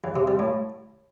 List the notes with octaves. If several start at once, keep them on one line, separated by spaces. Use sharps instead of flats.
E2
C3
G3
A2